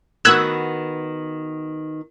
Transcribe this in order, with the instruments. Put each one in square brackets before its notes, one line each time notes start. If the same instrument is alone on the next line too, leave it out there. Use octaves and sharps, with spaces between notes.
[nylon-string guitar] D#3 B3 F#4 [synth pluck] E6 F#6 G#6